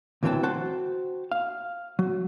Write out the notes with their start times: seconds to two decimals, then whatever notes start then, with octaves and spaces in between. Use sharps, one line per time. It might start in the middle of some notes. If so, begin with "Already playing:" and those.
0.23 D2 E3 F#3 C4 G5 A5
0.43 F#4 C5 G5 A5
1.32 F5
1.99 F#3